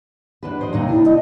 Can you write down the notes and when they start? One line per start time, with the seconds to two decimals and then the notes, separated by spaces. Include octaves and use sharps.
0.43 E2 D4 B4
0.61 C5 D#5
0.73 D#2 C3 D#4
0.89 D4 E4
1.06 D#5